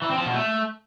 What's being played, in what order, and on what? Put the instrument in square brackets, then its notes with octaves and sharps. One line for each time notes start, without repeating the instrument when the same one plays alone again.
[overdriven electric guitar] E3
C4
F3
B2
A3